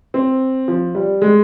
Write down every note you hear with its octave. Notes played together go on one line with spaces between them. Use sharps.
C4
F3
G3
G#3